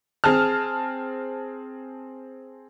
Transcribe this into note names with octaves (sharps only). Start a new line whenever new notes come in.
C4 G#4 A5 F6